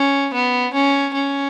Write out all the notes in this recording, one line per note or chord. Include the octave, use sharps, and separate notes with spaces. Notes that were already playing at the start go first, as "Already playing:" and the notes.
Already playing: C#4
B3
C#4
C#4